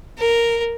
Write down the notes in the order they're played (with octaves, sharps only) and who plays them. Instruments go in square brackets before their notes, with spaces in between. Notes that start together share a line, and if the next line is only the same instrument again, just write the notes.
[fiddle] A#4